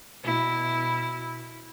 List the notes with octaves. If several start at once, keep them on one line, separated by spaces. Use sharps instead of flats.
B2 E4